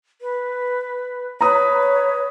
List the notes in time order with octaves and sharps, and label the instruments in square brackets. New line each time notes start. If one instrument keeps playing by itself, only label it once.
[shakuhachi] B4
[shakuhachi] B4 [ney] C#5 [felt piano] A#5 D#6